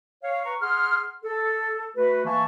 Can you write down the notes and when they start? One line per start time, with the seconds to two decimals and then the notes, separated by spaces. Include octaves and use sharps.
0.23 C#5 F5
0.45 B4 A#5 C#6
0.60 G#4 F#5 C6 F6
1.23 A4
1.96 A3 F#4 B4
2.25 E3 A#3 E5 A5 C#6